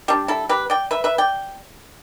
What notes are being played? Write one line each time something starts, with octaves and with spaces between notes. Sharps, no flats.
G3 D4 G4
E4 A4
G4 B4
D5 G5
B4 E5
B4 E5
D5 G5